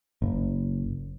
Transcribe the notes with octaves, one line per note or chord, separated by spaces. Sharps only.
F#1